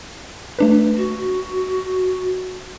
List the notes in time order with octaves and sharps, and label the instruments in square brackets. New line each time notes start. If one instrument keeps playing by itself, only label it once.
[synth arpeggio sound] A3 D4 B4
[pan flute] F#4